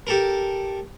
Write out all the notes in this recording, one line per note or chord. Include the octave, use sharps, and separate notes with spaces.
G4 A4 A#4